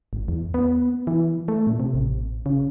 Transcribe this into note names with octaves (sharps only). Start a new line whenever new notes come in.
G#1
E2
B3
E3
A3
A#2
C3
A1
C#3